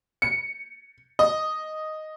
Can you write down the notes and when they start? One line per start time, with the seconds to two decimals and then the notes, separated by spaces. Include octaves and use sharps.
0.22 C#7
1.19 D#5